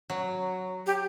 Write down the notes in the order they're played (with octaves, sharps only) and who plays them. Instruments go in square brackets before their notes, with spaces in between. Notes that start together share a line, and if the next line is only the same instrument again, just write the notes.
[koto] F#3
[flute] G4